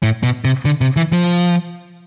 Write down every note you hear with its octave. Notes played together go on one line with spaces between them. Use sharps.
A2
B2
C3
D3
C3
E3
F3